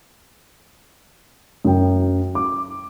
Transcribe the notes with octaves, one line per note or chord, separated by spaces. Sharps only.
F#2 G5
D6